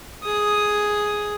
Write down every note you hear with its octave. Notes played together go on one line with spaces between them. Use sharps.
G#4 D#6